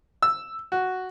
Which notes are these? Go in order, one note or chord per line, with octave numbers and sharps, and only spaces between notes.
E6
F#4